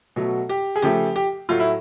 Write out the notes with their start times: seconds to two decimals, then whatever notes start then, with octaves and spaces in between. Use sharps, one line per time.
0.16 B2 F#3 A3
0.49 G4
0.76 G#4
0.82 C#3 F3 A3 G4
1.16 G4
1.49 A2 F#3 A3 F4
1.60 E4